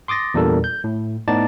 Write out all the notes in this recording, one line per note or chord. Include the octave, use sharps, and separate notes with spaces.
C6 D6 D#6 A6 A#6
E2 A#2 G3 D4 A4 A#4
G6
A2
A2 B3 D#4 D5 A5 A6